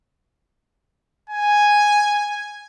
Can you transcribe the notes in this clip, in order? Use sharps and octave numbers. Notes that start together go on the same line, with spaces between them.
G#5